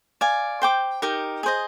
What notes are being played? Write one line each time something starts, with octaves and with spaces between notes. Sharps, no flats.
D5 F5 G#5
C5 G5 D6
D#4 G4 A#4
G#4 C5 D#5